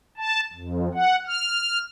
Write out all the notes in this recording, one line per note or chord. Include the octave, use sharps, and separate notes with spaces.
A5
F2
F#5
F6